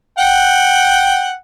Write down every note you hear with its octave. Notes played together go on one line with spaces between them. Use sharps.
F#5 G5